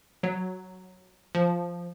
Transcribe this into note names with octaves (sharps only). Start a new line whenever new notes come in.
F#3
F3